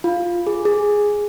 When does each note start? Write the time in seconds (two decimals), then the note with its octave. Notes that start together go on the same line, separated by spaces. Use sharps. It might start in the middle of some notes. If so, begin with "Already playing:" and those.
0.04 F4
0.47 G#4
0.65 G#4